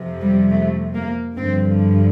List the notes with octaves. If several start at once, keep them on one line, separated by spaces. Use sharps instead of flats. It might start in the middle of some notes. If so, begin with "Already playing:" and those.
Already playing: F2 C3 F3
G3
A3
A#3
G2 D3 F3 C4